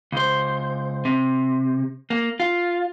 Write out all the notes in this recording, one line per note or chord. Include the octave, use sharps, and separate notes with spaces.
C#2 C5
C3
A#3
F4